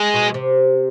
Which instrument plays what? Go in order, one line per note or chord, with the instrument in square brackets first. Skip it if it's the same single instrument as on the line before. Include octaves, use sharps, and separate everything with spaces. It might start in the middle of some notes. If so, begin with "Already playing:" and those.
Already playing: [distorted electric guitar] G#3
[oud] B2
C3